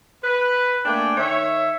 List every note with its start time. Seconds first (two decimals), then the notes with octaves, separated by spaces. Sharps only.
0.24 B4
0.85 A3 A#3 D4 D5 G5 G#5
1.17 D#3 C#5 E5